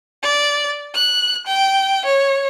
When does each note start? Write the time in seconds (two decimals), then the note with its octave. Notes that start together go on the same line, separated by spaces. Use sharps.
0.23 D5
0.94 F#6
1.47 G5
2.06 C#5